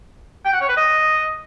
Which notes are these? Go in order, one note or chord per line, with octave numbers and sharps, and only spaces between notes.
G5
F#5
C#5
B4
D#5